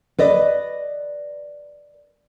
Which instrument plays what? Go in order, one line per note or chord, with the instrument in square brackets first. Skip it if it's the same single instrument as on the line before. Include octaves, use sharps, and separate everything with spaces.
[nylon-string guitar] B4 D5 D#5